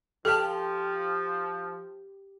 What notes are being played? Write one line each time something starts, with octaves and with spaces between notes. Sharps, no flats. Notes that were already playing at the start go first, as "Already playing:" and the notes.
F3 G4 A4 A5